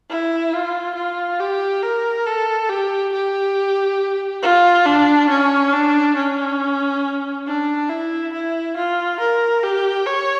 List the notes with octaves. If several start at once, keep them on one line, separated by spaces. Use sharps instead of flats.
E4
F4
F4
G4
A#4
A4
G4
G4
F4
D4
C#4
D4
C#4
D4
E4
E4
F4
A#4
G4
C#5